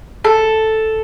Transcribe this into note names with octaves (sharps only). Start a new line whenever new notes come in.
A4